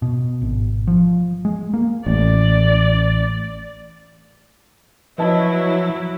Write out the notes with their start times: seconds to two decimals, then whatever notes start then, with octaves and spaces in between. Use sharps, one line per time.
0.02 B2
0.42 G#1
0.87 F3
1.45 G#3
1.74 A#3
2.06 A1 D5
5.18 F3 F#3 E4 B4 D#5 A5